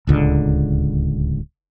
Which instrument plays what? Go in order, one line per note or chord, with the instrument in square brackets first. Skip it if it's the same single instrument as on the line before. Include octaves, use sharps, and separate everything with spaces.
[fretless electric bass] D1 C#2 D3